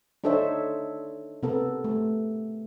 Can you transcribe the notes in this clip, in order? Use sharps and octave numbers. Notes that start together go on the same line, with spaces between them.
D4 D#4 A4 C5 C#5 E5
C3 B3 A4 A#4
A3